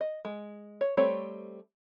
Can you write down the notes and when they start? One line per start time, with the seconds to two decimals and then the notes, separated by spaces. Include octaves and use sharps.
0.01 D#5
0.25 G#3
0.81 C#5
0.97 G3 A3 C4 C#5